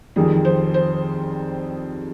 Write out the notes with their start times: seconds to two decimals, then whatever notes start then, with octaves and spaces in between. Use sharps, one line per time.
0.16 F2 D#3 G3 G#4
0.45 C5
0.74 C5